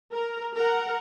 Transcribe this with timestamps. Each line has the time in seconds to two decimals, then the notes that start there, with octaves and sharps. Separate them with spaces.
0.14 A#4
0.57 A#4 F#5